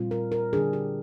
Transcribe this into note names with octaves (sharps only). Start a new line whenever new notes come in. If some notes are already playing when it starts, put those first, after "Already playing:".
Already playing: A#2 G3 C4 F4
A#4
A#4
D3 G3 D4 G#4
G4